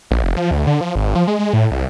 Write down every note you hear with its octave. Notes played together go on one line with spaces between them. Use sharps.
A#1
F1
F3
D2
D3
F3
G#1
F3
G#3
G#3
A2
C2